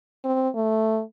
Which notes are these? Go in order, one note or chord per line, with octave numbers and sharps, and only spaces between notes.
C4
A3